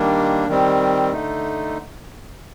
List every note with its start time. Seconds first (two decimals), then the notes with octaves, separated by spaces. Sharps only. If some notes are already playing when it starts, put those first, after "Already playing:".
Already playing: D#3 G3 A#3 D4
0.48 D#3 G3 C4
1.12 D3 A3 D#4